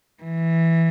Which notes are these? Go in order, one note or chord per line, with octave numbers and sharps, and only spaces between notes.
E3